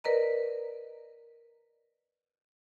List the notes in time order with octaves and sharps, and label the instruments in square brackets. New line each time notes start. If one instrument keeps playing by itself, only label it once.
[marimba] A#4 B4 D5 D#5 A#5